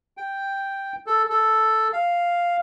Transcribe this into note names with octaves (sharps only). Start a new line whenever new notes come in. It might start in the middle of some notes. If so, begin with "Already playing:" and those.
G5
A4
A4
F5